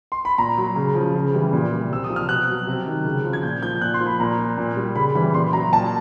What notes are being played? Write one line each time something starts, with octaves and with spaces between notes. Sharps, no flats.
C6
B5
A#2 A#5
F#3
C#3
F3
C#3
E3 G3
A#2
G3
C3 E6
D#6
F3
F6
B2 F#6
F#3
C3
D#3 F#3
C#3
F3
G#6
A#2 G6
F3 G6
A#2 F#6
C6
F3
B5
A#2 A#5
F3
A#2
G3
C#3 B5
E3 G3 B5
A#2 C6
F#3 A#5
A#2 A5